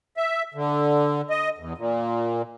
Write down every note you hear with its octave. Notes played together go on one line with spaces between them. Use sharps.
E5
D3
D#5
E2
A#2